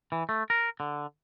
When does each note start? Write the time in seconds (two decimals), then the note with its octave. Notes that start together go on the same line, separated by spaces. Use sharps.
0.12 E3
0.29 A3
0.50 A#4
0.80 D3